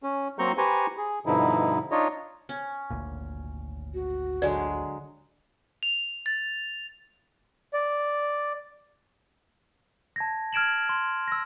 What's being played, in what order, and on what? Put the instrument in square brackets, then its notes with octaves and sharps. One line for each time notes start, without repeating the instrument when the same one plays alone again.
[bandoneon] C#4
F#3 A#3 C4 A#5 C#6 G6
G4 B4 C5 G#5 A#5 C#6
G#4
G2 B2 D3 F3 D#4 E4
D4 D#4 F4 C#5 D#5
[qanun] C#4
[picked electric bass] G#1 D2 A#2
[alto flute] F#4
[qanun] D3 F#3 G#3 [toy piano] D5
[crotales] F7
A6
[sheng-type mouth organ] D5
[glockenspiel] A5 G#6 A#6
F6 G#6 D7 E7 F#7
C6
E6 A#6